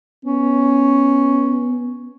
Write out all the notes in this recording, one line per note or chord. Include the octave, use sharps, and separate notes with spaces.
B3 C#4